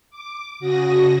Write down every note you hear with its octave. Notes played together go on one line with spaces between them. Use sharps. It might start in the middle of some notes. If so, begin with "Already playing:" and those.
D6
C#3 F#4 D#6 A#6